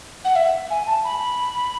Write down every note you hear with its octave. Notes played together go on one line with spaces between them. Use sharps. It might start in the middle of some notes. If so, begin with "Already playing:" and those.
F#5
E5
G#5
A5
B5